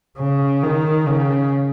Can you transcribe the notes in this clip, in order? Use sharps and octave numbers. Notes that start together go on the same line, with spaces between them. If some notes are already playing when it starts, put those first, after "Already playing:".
C#3
D#3
C#3